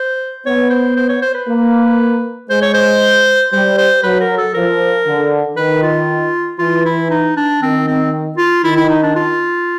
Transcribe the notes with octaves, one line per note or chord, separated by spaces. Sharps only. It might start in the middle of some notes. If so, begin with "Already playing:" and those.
Already playing: C5
B3 C#5
C5
C5
C#5
C5
B4
A#3
G#3 C5
C#5
C5
G3 C5
C5
F#3 B4
A#4
A4
F3 A#4
D3
D#3 B4
F4
E3 F4
E4
D#4
D4
D#3 C4
C4
F4
D#3 E4
E4
D#4
D4
F4